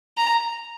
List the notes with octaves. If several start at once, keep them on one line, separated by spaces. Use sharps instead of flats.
A#5